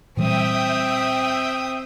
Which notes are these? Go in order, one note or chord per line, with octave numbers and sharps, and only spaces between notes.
A#2 E3 G3 C4 E5 G5 D#6